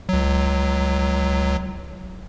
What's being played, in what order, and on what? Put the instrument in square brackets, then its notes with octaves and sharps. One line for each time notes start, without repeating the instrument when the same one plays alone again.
[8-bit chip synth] C#2 F#3